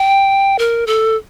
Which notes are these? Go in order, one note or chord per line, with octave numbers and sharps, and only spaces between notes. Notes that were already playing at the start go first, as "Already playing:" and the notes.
Already playing: G5
A#4
A4